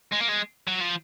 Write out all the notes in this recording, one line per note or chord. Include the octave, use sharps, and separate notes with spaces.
G#3
A#3
G#3
F#3
F3